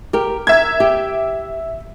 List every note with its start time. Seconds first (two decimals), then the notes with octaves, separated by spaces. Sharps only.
0.13 G4 A#4
0.47 A#4 E5 G#6
0.80 G4